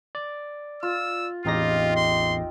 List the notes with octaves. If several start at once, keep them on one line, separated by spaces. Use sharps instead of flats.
D5
F4 E6
A1 E2 C4 D#4 F4 G4 A#6
C6